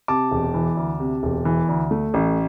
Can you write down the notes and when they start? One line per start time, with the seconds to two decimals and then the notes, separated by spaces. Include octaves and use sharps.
0.08 C3 A5 D6
0.31 E1
0.54 E3
0.77 D2
1.00 C3
1.23 E1
1.45 E3
1.68 D2
1.91 A3
2.14 A1